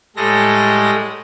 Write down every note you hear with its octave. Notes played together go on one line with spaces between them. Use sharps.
A2 G3 G#3 A4 D#5 A#6